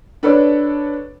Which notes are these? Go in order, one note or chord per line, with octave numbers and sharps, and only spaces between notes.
D4 A4 B4 C#5 D5